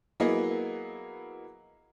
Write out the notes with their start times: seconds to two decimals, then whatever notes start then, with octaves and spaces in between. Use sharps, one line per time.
0.20 F#3 A#3 B3 E4 G#4 D#5